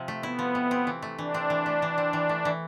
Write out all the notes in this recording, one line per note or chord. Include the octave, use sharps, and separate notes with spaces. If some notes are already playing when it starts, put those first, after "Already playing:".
Already playing: C3 F3
A3
B3 E4
F3
C3
C4
E3
A3
E3 D4
C4
E3
A3
E3
C4
E3
A3
E3